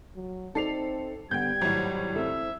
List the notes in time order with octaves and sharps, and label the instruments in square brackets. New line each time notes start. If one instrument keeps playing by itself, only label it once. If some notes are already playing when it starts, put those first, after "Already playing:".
[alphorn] F#3
[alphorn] C4 [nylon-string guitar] D#4 C5 D5 [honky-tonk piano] A4 C7 F7
[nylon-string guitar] D3 B3 [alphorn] G3 [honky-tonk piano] G5 G6 [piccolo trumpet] G#6
[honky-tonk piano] G#1 A2 [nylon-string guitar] F#3
[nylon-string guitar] C4 E4 A4 [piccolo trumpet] E5